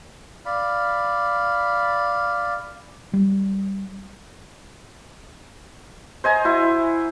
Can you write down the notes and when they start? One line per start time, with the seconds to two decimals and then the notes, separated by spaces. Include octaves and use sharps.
0.46 D5 F5 B5
3.13 G3
6.24 C5 D#5 G#5 A#5
6.45 E4 F#4